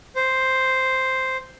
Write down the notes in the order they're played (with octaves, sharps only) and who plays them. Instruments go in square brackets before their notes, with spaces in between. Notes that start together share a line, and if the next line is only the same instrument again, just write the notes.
[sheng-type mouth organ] C5